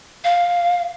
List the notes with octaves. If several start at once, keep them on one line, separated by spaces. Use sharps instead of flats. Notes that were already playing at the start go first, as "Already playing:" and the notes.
F5